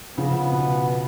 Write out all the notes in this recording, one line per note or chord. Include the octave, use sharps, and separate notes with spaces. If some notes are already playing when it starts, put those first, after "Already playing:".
C#3 F3 B3
B2